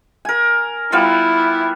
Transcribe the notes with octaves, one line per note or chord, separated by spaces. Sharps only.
A#4 G#5
G3 B3 E4 F4